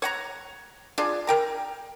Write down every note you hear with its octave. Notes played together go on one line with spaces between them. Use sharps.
C#5 F#5 A#5
D4 F4 G#4
A#4 G5 A#5